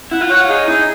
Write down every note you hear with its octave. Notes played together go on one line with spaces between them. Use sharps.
E4 F#5
F4
F#4 C#5
F4
D#4 G#4
D#4 E4